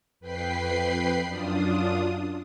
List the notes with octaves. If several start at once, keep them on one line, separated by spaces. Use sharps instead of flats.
F2 B4 G5 B5 C7
F#2 D4 F4 D#6